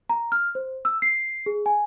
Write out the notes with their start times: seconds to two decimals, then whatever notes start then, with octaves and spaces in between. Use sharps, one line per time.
0.10 A#5
0.32 F6
0.55 C5
0.85 E6
1.02 C7
1.46 G#4
1.66 G#5